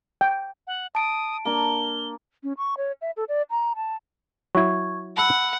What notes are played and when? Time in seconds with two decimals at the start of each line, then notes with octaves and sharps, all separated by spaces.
0.21 G5
0.67 F#5
0.95 A5 D#6 D7
1.45 A#3 D4 G7
2.43 C#4
2.57 C#6
2.77 C#5
3.01 E5
3.17 A4
3.29 D5
3.50 A#5
3.76 A5
4.55 F#3 E4 C#6 G#6
5.17 F#5 A5 B5 E6